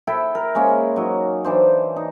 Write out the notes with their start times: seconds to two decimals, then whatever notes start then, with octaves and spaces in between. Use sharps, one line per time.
0.07 E4 A4 E5 G5
0.35 A#4
0.55 G#3 A#3 C#4
0.96 F#3 D#4
1.44 E3 D4 C5
1.96 D#4